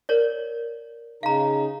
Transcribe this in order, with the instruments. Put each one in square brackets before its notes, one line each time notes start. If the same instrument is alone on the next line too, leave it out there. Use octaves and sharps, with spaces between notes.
[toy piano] A#4 C#5 D5
[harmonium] C#3 D#4 [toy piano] F5 A#5